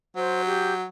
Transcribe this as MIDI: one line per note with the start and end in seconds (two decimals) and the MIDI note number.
0.16 0.86 54
0.16 0.43 72
0.45 0.73 67